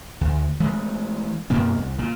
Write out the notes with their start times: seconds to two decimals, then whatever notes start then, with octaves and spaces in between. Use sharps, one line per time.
0.21 D2
0.60 E3 G#3 A3
1.50 F#2 B2 A#3 B3
1.78 C2
1.99 A#2